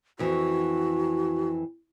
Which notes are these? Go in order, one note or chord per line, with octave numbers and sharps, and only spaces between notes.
F2 E3 F#4